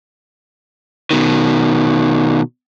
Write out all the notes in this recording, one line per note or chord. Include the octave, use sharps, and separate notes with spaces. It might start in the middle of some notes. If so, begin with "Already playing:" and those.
B2 D#3